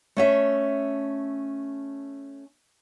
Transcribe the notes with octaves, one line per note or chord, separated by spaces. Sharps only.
A3 C#4 E5